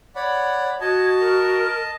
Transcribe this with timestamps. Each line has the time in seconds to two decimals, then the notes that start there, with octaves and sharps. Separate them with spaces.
0.16 C#5 D5 F#5 B5
0.81 F#4 D#5 A5 G#6
1.20 A#4